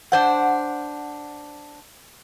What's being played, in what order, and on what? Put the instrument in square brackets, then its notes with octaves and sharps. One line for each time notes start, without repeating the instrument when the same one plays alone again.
[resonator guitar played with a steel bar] D4 C5 F#5